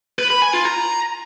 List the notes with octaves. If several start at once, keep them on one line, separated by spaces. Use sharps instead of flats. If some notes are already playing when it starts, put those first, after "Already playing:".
B4
B5
G#5
F4
A#5